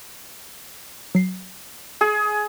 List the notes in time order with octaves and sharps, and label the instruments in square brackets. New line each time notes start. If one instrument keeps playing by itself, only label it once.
[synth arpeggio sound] F#3 C7
[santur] G#4